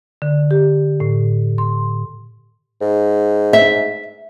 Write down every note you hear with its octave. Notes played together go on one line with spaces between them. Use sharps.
D3
G4
A2
C6
G#2
E5